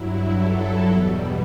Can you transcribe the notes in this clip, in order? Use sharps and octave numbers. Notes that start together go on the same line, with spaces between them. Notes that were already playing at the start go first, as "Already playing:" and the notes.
Already playing: G2 F#3 E4
A4
E2 B2 G3